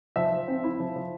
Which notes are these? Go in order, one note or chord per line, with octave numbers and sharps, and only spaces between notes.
F3 E5
F3
C4
E4
F3
F3